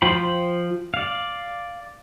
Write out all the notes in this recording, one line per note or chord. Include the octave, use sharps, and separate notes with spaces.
F3 F4 C5 G5 B5
D5 F5